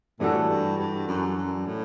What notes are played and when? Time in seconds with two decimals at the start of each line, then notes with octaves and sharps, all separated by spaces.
0.20 A2 E3 G3 D4 F#4 A4
0.49 G2
0.78 G2
1.08 F#2
1.37 F#2
1.67 A2